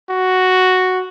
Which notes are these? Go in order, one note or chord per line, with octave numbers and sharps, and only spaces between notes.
F#4